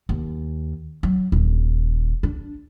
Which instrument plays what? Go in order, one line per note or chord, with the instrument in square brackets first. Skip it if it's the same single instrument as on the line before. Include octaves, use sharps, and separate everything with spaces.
[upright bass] D#2
F#3
D#1
D4